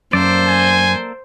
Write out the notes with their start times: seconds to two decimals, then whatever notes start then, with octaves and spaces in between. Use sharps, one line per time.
0.13 F#2 A#3 A4 C5 D5
0.48 G#5